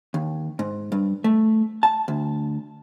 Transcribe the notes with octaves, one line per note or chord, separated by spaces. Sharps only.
D#2
G#2
G2
A3
A5
D2